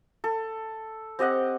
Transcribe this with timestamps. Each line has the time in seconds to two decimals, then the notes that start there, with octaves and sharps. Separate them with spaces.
0.24 A4
1.19 C4 G4 D#5 F#5